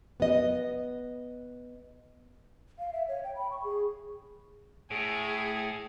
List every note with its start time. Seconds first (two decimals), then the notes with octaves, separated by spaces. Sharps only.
0.20 B3 D#5
2.79 F5
2.93 E5
3.08 C#5
3.24 G5
3.36 B5
3.51 C#6
3.64 G#4
4.91 A2 G#4